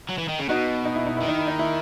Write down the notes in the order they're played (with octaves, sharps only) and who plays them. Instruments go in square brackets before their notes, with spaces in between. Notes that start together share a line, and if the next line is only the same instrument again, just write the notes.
[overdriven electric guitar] F#3
E3
D#3
C#3
[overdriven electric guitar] B2 [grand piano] D#4 F#4
[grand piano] D#4
E4
D#4
[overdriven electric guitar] D#3 [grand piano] E4
[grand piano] D#4
E4
D#4
E4